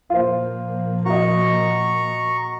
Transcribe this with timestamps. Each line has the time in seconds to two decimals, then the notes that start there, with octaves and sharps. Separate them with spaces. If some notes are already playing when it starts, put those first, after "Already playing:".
0.10 A#2 F3 A#3 F4 C5
1.06 F#4 D#5 A#5 C#6